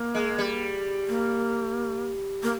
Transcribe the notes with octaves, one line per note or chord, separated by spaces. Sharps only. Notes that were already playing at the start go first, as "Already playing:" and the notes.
Already playing: A#3
G#3
G3
A#3
A#3